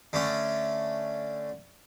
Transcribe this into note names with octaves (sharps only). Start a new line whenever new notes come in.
D3 A3 C#4